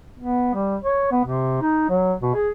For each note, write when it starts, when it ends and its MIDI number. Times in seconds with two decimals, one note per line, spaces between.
0.19 0.52 59
0.54 0.76 55
0.83 1.10 73
1.11 1.22 59
1.25 1.61 48
1.61 1.89 63
1.90 2.14 54
2.22 2.33 47
2.34 2.50 68